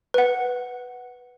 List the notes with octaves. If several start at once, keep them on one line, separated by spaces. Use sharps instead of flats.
B4 F#5